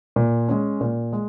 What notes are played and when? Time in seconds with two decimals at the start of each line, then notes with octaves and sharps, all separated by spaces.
0.16 A#2
0.48 G#3 C#4
0.81 A#2
1.13 G#3